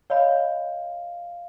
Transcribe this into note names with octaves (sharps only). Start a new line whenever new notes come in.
C#5 D#5 F5 B5